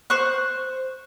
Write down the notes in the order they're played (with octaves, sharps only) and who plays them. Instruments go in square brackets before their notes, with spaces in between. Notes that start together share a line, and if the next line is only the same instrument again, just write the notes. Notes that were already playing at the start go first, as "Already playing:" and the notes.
[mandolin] C5 C#6 F#6